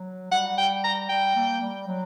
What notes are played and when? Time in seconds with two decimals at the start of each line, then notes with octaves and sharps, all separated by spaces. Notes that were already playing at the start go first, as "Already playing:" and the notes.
Already playing: F#3
0.31 G3 F#5
0.58 G5
0.84 A#5
1.09 G3 G5
1.35 A#3
1.61 G3
1.87 F#3